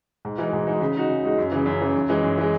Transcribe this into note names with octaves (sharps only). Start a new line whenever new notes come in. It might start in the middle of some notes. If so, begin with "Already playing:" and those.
G#2
E3 G#3 D#4 F#4
G#2
E3 G#3 D#4 F#4
C#3
G#3 D#4 F#4
C#3
G#3 D#4 F#4
F#2
C#3 E3
F#2
C#3 E3
F#2
E3 G#3
F#2
E3 G#3